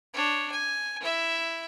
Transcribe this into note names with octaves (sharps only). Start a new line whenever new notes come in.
D4 C#5
G#5
E4 E5